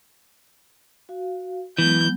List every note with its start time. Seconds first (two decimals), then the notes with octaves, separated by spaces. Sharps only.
1.09 F#4 F5
1.78 E3 F#3 G#3 B3 G6